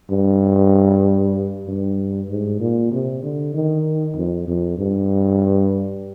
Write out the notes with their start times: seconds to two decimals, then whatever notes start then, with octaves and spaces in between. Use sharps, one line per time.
0.10 G2
1.67 G2
2.29 G#2
2.60 A#2
2.92 C3
3.23 D3
3.54 D#3
4.16 F2
4.48 F2
4.78 G2